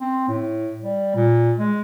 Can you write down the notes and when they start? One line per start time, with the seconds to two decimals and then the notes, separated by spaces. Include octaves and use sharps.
0.01 C4
0.29 A2
0.82 G3
1.15 A#2
1.58 G#3